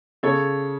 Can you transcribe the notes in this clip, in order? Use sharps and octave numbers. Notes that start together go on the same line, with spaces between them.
C#3 A4 C#5